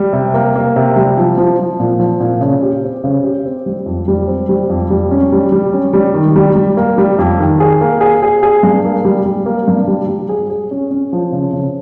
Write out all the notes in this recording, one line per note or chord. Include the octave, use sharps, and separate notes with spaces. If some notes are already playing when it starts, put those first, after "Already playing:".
Already playing: G3
C3
A#3
A#3
C3
G3
F3
F3
F3
A#2
F3
A#2
C#3
G4
C4
C#3
G4
C4
G3
F2
G3
C4
G3
F2
G3
C#4
G3
G3
C#4
G3
D#3
G3
G3
A#3
G3
F2
D#3
G#4
A#3
G#4
G#4
G#4
G2
A#3
G3
G3
A#3
G2
G3
G3
G#4
G#4
C#4
C#4
F3
C#3
C#3